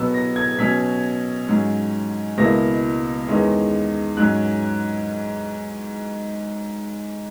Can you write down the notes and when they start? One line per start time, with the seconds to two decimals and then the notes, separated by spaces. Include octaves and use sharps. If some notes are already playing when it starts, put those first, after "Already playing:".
Already playing: B2 F#3 B3 E6
0.14 A#6
0.36 G#6
0.58 B2 F#3 C#4 B6
1.48 G#2 F#3 C#4
2.38 C#2 B2 A#3 E4 A#6
3.27 E2 D#3 G#3 C#4
4.17 G#2 F#3 C#4 F#6